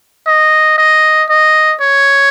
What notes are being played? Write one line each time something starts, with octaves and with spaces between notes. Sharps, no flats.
D#5
D#5
D#5
C#5